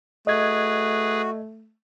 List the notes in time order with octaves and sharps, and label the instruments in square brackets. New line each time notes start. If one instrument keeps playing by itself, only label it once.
[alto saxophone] A3 [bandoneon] F#4 [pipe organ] G#4 B4 [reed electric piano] D#5 G#6